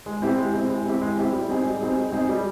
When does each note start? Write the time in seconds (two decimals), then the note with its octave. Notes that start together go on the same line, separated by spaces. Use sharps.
0.06 G#3
0.22 C4 E4 G4
0.38 G#3
0.54 C4 E4 G4
0.69 G#3
0.85 C4 E4 G4
1.01 G#3
1.17 C4 E4 G4
1.33 G3
1.49 C4 D#4 G#4
1.64 G3
1.81 C4 D#4 G#4
1.96 G3
2.12 C4 D#4 G#4
2.29 G3